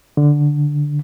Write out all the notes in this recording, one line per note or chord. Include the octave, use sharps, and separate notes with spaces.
D3